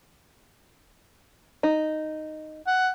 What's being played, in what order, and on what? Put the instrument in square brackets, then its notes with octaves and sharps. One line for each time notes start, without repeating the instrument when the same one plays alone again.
[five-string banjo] D#4
[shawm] F#5